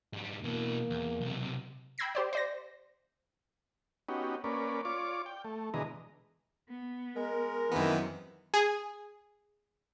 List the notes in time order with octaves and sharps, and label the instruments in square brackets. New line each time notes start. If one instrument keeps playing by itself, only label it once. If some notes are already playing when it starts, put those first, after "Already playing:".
[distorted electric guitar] G#2 G3
[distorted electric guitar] B2 E3 [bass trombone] A#3
[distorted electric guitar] E2
B1 C3
[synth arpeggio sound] G5 B5 E6 G#6 A#6 C7
G4 C5 D5
C5 D5 A#6
[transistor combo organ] B3 C#4 D#4 F#4 G4
A#3 C#4 B4 D5
F4 C#5 D5 D6
G5
A3
B2 D3 E3 G#3 D#5 A#5
[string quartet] B3
[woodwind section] G#3 A#4
[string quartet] F#2 C3 [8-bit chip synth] D#3 B3 [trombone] E3
[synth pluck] G#4